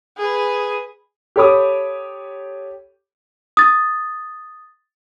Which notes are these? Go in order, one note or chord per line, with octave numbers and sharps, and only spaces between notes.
G#4 B4
G4 A4 C#5 B5 D6 D#6
D#6 A6